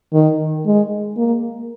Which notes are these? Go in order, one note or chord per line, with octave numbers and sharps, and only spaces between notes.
D#3
G#3
A#3